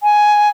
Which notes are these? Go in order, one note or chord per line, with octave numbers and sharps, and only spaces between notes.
G#5